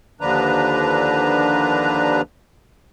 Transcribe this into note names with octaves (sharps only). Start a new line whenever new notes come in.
D#2 D3 F3 D4 B4 A#5